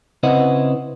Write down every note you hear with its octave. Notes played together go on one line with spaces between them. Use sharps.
C#3 C4 E4 B4 D#5 F#5